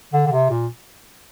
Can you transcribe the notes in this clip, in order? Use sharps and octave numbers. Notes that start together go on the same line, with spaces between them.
D3
D3
C3
A#2